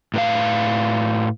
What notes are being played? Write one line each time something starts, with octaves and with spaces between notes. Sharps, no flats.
A2 B4 F5